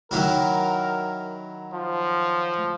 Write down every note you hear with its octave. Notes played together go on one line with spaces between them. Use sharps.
D#3 F#3 E4 A#4
F3